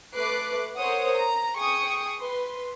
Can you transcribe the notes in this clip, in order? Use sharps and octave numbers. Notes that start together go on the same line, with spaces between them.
A3 B4 D6 F#6 C7
A#4 C5 C#5 F#5 D#6
A#5
G#4 G5 C#6 D#6
B4 C6